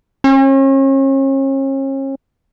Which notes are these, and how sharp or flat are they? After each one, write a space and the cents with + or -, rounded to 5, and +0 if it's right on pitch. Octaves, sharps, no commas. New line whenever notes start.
C#4 -40